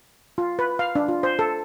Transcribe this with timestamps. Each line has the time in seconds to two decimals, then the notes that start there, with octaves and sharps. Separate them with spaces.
0.38 F4
0.59 B4
0.79 F5
0.95 D4
1.08 F4
1.23 C5
1.39 A4